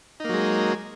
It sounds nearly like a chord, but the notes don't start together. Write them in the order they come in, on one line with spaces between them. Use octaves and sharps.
D#4 A#3 F#3 G#3